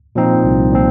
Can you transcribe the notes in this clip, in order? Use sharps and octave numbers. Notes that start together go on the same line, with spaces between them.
A#2 F3 C4 D#4
C2
A#2 F3 C4